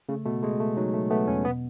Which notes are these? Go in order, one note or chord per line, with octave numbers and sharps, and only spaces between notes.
C#3 A3
B2 A3
G#3 A3
A3
F#3 D#4
A3
A3 B3
E2 C#4
B2 B3